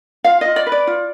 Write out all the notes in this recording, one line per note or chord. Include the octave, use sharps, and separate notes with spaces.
F4 F5
F4 D#5
D5
B4
D5
F4